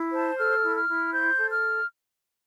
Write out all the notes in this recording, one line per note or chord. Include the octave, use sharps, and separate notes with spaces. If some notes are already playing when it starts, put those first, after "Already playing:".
Already playing: E4
C5 A5
A4 F6
E4
F6
E4
C5 G6
A4
F6